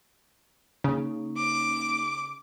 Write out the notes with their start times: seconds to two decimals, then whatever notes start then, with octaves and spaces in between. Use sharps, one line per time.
0.84 C#3 A#3 C#4 D#4
1.37 D6